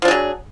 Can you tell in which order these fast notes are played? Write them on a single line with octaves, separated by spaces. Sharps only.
F3 D4 G#4 F#3